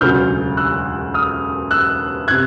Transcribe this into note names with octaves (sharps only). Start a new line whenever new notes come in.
E1 D2 C#3 F#3 F6 G6
E6 F#6
D#6 F6
E6 F#6
C3 F#6 G#6